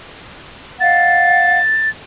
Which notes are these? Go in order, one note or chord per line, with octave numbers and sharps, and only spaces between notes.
D#5 F5 F#5 A6